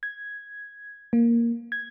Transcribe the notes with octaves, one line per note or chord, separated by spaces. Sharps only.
G#6
A#3
G#6